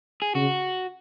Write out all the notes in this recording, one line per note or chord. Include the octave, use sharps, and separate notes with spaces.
G#4
C#3 F#4